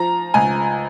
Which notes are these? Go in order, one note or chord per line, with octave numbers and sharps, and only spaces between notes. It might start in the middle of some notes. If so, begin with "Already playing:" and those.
Already playing: F3 A#5
C#2 G#5